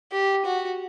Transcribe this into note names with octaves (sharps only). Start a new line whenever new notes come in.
G4
F#4